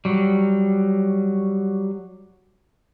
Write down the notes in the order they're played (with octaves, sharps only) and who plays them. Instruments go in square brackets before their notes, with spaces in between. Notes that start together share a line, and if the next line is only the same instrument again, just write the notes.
[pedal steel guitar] F#3 G3